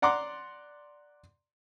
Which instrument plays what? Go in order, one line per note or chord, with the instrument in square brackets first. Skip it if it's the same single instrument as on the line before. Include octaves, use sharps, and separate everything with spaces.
[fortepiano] D5 F#5 A#5 C6 D6